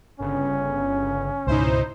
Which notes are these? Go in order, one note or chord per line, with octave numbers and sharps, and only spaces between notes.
G1 C#3 C#4
C#2 G#2 B2 D#4 E4 C5